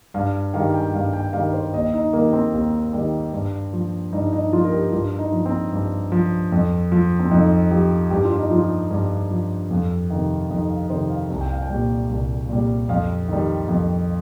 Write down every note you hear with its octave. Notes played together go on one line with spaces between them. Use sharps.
G2 F5
D#3 G3 F5
G5
G2 F5
G5
D#3 G3 F5
C5
D#2 D#5
D#4
D#3 G3 A#3
C4
D#2
D#3 G3
G2
F3
G2 D#4
D#4
F3 F4
A#4
G4
G2 F4
D#4
F3
C4
G2
F3
F2
F3
C4
F2 D#4
F3 G4
G2 G4
F4
D#4
F3 F4
G2
F3
F2
C3 D#3
F2 D#4
F5
C3 D#3 C5
F5
C2
G5
F5
G5
A#2 G3
C2
A#2 G3
F2 F5
D#3 G3
F2